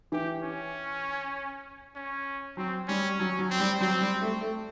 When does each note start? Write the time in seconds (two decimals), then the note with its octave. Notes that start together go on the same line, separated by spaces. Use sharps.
0.12 E3 G4
0.42 C#4
1.96 C#4
2.57 F#3 C4
2.88 G3 C#4
3.19 F#3 C#4
3.39 F#3
3.50 C4
3.60 G3
3.80 F#3 C4
4.01 G3
4.21 A3
4.41 A3